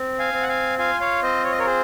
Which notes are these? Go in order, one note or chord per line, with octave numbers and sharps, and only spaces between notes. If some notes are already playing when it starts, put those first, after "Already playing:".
Already playing: C4
F5 G#5
C4
F#5
F5 G#5
F4 F5 G#5
C#5 F5
C4 C5 D#5
C#5
D#5
A#4 C#5
G#4 C5